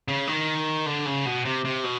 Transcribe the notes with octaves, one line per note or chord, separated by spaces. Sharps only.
C#3
D#3
D3
C#3
B2
C3
C3
B2